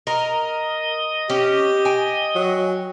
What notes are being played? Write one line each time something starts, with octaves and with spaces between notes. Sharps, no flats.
A#4 D#5
C#4 G4
G5 G#5
F#3